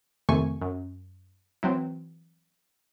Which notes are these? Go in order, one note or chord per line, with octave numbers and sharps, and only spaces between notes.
F2 C3 D#3 A3 G#5 C#6
F#2
E3 F#3 C4